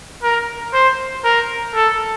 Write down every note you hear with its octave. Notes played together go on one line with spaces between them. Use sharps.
A#4
C5
A#4
A4